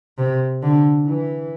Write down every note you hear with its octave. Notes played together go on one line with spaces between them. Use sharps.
C3
D3
E3